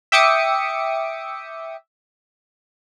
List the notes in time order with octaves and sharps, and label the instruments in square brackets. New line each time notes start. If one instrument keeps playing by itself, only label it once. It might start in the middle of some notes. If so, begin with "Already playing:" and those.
[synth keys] E5 G5 D6 D#6 C#7